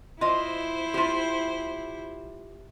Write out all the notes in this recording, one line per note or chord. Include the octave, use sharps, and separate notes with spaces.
E4 F4 C5 D#5
F4 G4